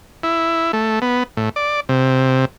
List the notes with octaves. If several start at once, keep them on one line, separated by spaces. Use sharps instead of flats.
E4
A3
B3
A2
D5
C3